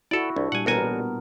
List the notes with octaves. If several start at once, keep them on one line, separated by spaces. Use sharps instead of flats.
E4 F#4 A4 D5
C2 D4
A#2 G3 F#5 G#5
A1 B2 B3 F#4 A#4 G#5